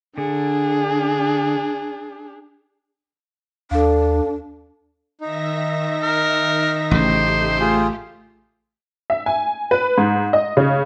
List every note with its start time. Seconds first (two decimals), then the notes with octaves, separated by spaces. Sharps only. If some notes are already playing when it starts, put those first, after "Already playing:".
0.18 D3 D4 G#4
3.71 D#2 D4 A4 F5
5.21 D#3 D#4 E5 A#6
6.02 A#4
6.91 A1 C#3 A3 G4 C5
7.60 F4 G#4
9.10 E5
9.26 G#5
9.71 B4
9.98 G#2
10.33 D#5
10.57 C#3